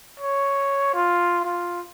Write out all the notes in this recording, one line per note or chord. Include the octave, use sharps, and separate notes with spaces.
C#5
F4
F4